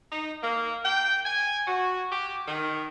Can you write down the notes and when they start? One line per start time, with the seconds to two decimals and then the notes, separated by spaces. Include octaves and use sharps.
0.12 D#4
0.43 A#3
0.85 G5
1.25 G#5
1.67 F#4
2.12 G4
2.48 D#3